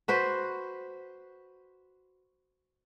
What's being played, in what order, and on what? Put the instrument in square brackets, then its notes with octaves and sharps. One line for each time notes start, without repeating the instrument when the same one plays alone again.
[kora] F#4 B4 C5